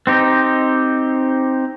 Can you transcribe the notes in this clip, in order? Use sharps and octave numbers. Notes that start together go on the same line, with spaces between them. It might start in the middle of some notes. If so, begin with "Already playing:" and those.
C4 D#4 G4